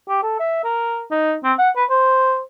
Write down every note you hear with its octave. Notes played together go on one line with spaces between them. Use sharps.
G4
A4
E5
A#4
D#4
C4
F#5
B4
C5